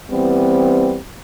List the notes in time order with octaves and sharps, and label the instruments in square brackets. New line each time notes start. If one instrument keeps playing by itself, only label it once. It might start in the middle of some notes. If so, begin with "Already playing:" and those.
[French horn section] E3 G3 B3 C4